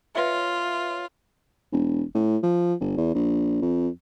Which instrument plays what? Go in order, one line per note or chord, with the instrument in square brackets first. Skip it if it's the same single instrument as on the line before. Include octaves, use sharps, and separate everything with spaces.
[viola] F4 [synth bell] B4 C#5 E5
[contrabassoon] E1
A2
F3
G1
E2
A#1
F2